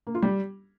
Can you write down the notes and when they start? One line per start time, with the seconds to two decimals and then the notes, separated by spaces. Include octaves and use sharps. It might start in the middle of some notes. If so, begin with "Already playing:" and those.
0.07 A#3
0.15 F4
0.22 G3